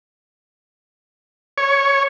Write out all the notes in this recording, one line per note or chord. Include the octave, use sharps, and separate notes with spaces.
C#5